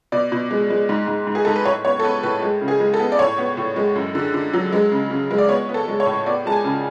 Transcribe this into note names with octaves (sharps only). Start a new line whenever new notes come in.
B2 D5
B2
G#3
G#3
G#2
G#2
G#2
G#4
G#2 A4
B4
A2 C#5
B3 C#5
A4
B3 B4
A2 B4
G#3
C#3
G#4
G#3
A4
B3
D5
A2 C#5
B3
A2
G#3
F#2
D3
D3
F#3
G#3
C#3
C#3
G#3
D5
B3 C#5
B3
A4
G#3
C#5
A2
B3 D5
G#3 A5
G#5
C#3